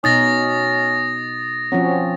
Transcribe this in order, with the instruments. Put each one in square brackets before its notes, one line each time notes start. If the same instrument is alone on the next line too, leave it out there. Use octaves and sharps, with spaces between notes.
[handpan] B2 D#4 [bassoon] C#4 [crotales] D#6 A6 A#6
[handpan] F3 C4 C#4 [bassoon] F#3